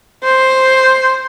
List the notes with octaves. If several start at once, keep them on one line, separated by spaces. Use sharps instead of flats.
C5